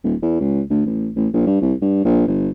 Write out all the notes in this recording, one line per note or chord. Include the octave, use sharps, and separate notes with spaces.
D#1
E2
C#2
D2
A1
A1
A#1
G2
C2
G2
A#1
G1